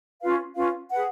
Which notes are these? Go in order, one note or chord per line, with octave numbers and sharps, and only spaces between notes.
C#4 F4 B4 F5
C#4 F4 B4 F5
G#4 B4 F#5